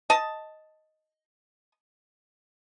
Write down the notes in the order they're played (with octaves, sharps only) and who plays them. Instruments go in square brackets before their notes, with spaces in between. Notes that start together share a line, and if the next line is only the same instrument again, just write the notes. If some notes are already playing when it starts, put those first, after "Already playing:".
[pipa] D#5 A5